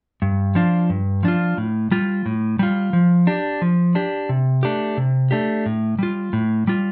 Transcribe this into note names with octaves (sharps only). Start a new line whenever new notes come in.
G2
F3 D4 F4
G2
F3 D4 F4
A2
G3 F4
A2
G3 F4
F3
D4 G4
F3
D4 G4
C3
A3 D4 G4
C3
A3 D4 G4
A2
G3 F4
A2
G3 F4